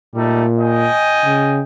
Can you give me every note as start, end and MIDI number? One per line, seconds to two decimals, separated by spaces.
0.15 0.88 46
0.15 0.44 55
0.15 0.44 57
0.15 0.44 63
0.60 1.63 75
0.60 1.63 79
0.60 1.63 80
1.25 1.62 49